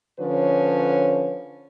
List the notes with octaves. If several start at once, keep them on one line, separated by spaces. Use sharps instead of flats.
D3 F3 C#4 B4 C#5